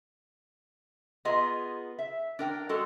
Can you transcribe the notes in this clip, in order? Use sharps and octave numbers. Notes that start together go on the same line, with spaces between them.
B3 F4 G#4 D#5 A#5
E5
D4 A#4 G5
G#3 F#4 A4